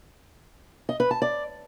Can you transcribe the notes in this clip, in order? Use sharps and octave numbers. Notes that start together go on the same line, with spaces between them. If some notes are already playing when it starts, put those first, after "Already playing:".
D#5
B4
A5
D5